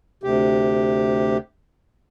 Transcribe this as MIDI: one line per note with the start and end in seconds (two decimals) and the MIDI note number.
0.23 1.37 38
0.23 1.37 48
0.23 1.37 67